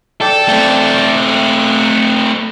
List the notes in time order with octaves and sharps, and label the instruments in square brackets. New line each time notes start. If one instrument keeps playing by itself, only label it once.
[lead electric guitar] A4 [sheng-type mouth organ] D5 G5 A5
[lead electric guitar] A3 C4
[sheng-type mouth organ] F#6